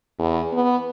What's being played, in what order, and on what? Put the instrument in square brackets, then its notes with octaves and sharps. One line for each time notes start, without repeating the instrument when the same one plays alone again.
[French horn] E2
B3